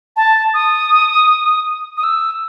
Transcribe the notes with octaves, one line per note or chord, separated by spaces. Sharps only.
A5
D#6
D#6
E6